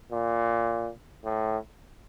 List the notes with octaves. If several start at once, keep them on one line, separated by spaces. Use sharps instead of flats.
A#2
A2